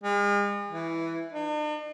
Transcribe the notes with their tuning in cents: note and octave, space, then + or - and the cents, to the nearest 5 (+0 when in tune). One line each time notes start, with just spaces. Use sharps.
G#3 -40
E3 +0
D4 +45